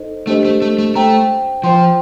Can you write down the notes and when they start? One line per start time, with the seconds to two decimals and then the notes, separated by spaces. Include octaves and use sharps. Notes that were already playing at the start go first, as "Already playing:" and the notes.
Already playing: D#4 A4 C5 D#5
0.27 A3 D4 G4 C5 D#5
0.45 A3
0.62 A3
0.79 A3
0.95 A3 C5 G5 A#5
1.64 F3 C5 G5 C6